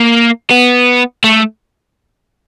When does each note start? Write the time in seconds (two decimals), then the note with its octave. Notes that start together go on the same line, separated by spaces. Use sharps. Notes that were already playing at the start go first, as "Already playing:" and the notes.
Already playing: A#3
0.50 B3
1.24 A3